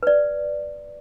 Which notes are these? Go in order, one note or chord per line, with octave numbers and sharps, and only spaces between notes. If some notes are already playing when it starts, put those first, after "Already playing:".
B4 D5